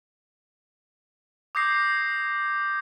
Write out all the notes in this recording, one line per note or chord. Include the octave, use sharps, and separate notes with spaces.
D6 D#6 G6 A#6 C7